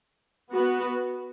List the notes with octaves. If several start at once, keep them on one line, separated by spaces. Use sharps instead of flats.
B3 F#4 B4